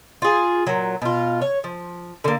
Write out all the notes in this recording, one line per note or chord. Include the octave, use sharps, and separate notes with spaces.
F4 G#4
A#2 F#3
B2 F4
C#5
F3
D3 A#3